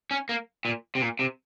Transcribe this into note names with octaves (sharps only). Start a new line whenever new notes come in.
C#4
A#3
A#2
C3
A#2
C3